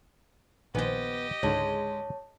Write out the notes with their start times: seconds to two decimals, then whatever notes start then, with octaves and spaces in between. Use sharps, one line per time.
0.75 A#1 D#3 B3 G4 C5 D#5 G#5
1.43 C#2 G#2 D3 G#3 C#5 A5